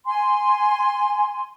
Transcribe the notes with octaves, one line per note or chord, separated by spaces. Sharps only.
G#5 C6